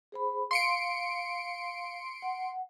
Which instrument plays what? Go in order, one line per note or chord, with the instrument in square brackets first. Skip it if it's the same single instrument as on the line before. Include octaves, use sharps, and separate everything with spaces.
[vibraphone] G#4 C5 B5
[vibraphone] F5 [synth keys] C6 C#7 D7
[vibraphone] F#5